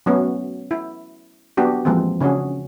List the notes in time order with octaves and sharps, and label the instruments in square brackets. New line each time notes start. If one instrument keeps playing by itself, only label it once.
[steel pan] F#3 A3 B3 C#4 F#4
E4
F#3 B3 D4 F#4 G4
E3 F3 G#3 A#3 C4
C#3 C#4 D4 F#4 G#4